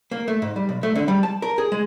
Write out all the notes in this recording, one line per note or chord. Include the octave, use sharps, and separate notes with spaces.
A#3
A3
G#2
G3
B1
A3
D3
G3
A5
A#4
G#4
G#3